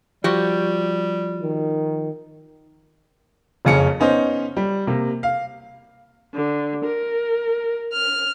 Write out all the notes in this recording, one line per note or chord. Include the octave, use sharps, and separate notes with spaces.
F3 G3 F#4 G4
D#3
F#1 F2 C#3 C#4 C#7
B3 C#4 D#4 C5
G3
C3 A#3
F5
D3
A#4
F6